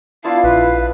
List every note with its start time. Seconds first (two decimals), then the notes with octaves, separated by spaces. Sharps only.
0.24 B3 D4 E4 F4 F5 A5
0.44 A#1 E4 B4
0.74 A5